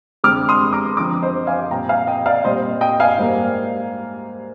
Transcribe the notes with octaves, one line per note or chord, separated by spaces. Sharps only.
D3 G#3 C4 D6 F6
C6 D#6
A#5 D6
D3 F3 C4 A#5 D6
C5 D#5
F5 G#5
A#2 G3 C4 G5 A#5
F5 G#5
D#5 G5
D5 F5
A#2 G3 C4 C5 D#5
D#5 G5
F5 G#5
G#2 G3 A#3